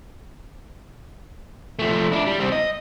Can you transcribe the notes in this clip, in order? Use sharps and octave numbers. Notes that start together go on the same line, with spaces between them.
F3 A3
D4 E4
G3
G3 C4
D#5